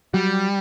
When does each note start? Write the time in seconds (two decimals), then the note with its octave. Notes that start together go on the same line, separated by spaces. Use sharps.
0.14 F#3 G3